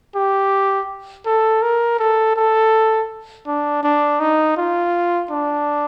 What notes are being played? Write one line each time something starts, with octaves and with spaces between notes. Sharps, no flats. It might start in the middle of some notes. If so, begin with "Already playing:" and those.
G4
A4
A#4
A4
A4
D4
D4
D#4
F4
D4